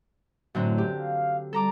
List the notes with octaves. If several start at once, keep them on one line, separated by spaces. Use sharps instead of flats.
F#2 A2 D3 C4
G4
F5
G3 A4 A#5 D6